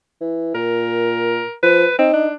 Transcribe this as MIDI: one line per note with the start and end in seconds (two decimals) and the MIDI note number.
0.21 0.51 52
0.55 1.40 46
0.55 1.55 70
1.63 1.85 53
1.63 1.97 71
1.98 2.11 60
1.98 2.26 63
2.13 2.35 62